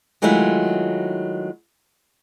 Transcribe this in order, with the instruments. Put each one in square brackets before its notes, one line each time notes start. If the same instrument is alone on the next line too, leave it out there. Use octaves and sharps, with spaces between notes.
[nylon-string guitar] D#3 F#3 G#3 A3 E4 F4